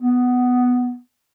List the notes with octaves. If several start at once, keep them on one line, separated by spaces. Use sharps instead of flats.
B3